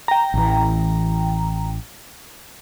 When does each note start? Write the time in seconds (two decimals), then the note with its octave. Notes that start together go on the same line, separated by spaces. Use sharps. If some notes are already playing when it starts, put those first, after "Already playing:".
0.08 G5 A#5
0.34 A1 E3